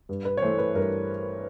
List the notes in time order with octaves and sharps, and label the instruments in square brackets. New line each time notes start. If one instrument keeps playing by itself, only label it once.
[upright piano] G2
B4
C#5
E3 A3 C5
B4
G2 A#4